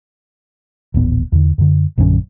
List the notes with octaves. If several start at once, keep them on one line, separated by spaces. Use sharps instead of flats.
D#1 A1 B3
E2 D3
F#2 D3
A#1 F#2 D3 C#4